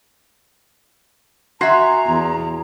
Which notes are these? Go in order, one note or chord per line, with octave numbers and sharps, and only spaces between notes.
F#4 E5 G#5 A#5 C6
E2